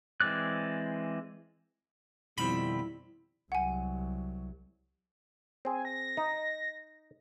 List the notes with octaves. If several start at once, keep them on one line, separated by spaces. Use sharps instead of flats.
E3 G#3 C4 D5 F#6
F2 B2 D#3 G3 C4 E4 B5
C2 F#3 F#5 G#5
C4 G#4 G#5
A#6
D#4